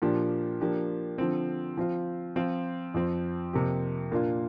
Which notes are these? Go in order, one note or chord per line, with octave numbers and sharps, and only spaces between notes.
A#2 F3 D4 G4
F3 A#3 D4 G4
D3 F3 C4
F3 C4 F4
F3 C4 F4
F2 F3 C4
F2 C3 A#3 G4
A#2 A#3 D4 F4